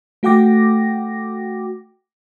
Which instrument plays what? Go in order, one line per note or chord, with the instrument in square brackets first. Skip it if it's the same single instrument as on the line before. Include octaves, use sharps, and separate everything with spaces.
[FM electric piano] A3 F#4 F#5 G5 D6 A#6